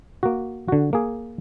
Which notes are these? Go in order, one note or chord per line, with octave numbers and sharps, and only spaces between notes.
A#3 F#4
D3 F#4
A#3 G#4